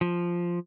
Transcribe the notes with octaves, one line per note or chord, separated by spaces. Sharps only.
F3